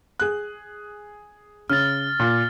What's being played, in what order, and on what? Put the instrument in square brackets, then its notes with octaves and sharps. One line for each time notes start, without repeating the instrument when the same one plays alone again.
[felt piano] G#4 F#6
[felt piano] C#3 [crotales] F6 A6
[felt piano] A#2